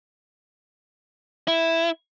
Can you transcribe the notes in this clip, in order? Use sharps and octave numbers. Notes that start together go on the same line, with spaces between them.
E4